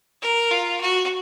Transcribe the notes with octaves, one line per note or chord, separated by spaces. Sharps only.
A#4
F4
F#4